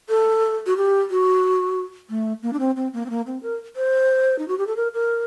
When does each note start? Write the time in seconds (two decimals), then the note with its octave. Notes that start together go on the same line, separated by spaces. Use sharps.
0.09 A4
0.66 F#4
0.77 G4
1.10 F#4
2.10 A3
2.42 A#3
2.53 D4
2.59 C4
2.76 C4
2.94 A#3
3.06 C4
3.10 A#3
3.27 C4
3.43 A#4
3.76 C5
4.39 D#4
4.48 F#4
4.58 G4
4.67 A4
4.77 A#4
4.93 A#4